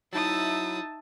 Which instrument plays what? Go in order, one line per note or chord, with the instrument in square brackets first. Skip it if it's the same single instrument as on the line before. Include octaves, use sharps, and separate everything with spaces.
[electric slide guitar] F#3 E4 [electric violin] D#4 D#6 [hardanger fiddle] E5 A5